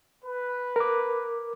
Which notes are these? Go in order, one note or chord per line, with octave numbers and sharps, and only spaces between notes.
B4
A#4 D6